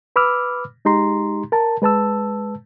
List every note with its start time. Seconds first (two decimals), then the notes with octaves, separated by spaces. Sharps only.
0.16 B4 B5 D6 E6 F6
0.85 G#3 D#4 G4 A#5 C6
1.52 A#4 A5
1.82 G#3 B4 A5 E6